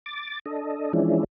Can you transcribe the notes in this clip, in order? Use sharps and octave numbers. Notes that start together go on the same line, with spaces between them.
D6 A6
D4 A4 D#5
E3 F3 G#3 C#4 D4 E4